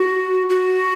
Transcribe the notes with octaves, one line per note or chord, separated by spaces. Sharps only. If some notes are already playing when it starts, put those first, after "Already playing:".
Already playing: F#4
F#4